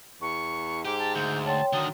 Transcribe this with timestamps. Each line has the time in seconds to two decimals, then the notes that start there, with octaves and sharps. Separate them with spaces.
0.21 E2 C#6
0.85 G#2 G4 D6
0.99 A5
1.16 D2 G6
1.46 C#5 G5 A5 C6
1.73 D3 D#3 F#3 D#6